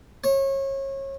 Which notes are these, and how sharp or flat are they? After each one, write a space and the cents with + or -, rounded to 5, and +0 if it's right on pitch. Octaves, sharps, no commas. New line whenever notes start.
C#5 -30